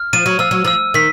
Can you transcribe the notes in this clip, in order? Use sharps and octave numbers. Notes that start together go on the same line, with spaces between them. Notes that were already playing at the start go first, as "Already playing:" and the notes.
Already playing: F6
F3 D#7
F#3
F3 E6
F#3
F3 E6
D#3 B6